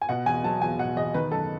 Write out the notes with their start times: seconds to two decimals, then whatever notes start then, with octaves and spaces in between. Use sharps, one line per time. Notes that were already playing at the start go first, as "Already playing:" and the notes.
0.02 G#5
0.09 B2 F#5
0.26 E2 G#5
0.44 F#3 A5
0.62 E2 G#5
0.79 B2 F#5
0.96 E2 D#5
1.14 D#3 B4
1.32 F#2 A4